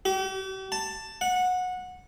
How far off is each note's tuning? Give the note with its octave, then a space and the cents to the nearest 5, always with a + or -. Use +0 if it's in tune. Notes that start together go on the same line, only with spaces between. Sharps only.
G4 -40
A5 +10
F#5 -20